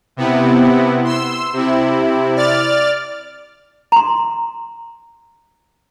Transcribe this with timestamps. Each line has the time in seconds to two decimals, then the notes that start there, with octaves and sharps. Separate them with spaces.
0.17 C3 B3 E4
1.04 C6 E6
1.53 C3 E4
2.36 D5 F6 A6
3.92 A#5 C6